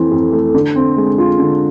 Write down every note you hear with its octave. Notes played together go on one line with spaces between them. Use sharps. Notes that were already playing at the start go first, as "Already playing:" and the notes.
Already playing: F2 E3 A3 C4
F2
A3
D3
C4
G#3
F4
D3